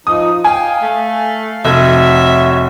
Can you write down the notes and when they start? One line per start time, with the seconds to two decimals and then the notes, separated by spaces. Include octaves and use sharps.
0.07 F3 D#4 D#6
0.44 F5 G5 G#5
0.82 A3
1.65 F1 F#4 C#5 E5